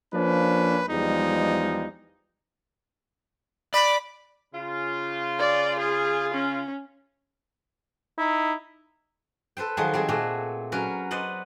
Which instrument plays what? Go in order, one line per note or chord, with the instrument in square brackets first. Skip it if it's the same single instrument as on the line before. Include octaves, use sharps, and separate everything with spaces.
[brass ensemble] F3 A#3 C#4 D4 B4
E2 F3 G3 G#3 D#4
[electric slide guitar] D5 [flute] B5
[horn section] C#3 F4
[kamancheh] D5
G#4
C#4
[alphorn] D#4 [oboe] E4
[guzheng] A4 B4 C5 G5
D#3 F3 F#3 F#4 G#4 C5
G3 C4 G#4
A#2 A3 F#4 G#4
F#3 C#4 F#4 A#4 B4
B4 C5 D5 D#5 F#5